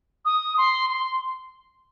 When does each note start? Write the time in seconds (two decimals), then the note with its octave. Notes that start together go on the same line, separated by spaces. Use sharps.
0.25 D#6
0.57 C6
0.90 C6